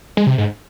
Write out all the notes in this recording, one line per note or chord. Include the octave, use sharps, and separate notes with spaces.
G#3
C3
G#2